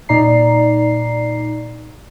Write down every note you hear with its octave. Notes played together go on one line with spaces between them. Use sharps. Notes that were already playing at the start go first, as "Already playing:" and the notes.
A#2 D#4 D5 A#5 C7